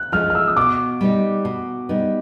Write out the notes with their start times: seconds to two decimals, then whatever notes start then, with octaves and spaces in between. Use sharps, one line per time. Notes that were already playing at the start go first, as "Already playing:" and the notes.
Already playing: F#6
0.12 F3 G#3 C#4 F4 F6
0.30 F6
0.35 E6
0.48 D#6
0.57 B2 D6
1.01 G3 B3 D#4
1.45 B2
1.89 G3 B3 D#4